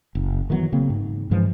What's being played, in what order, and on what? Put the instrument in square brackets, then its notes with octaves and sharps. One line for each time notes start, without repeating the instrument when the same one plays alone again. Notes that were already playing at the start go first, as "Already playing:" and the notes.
[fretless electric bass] F#1
D#3 E3 F#3 B3
C#3 A#3 C4
G#2
G2 E3 F3 G#3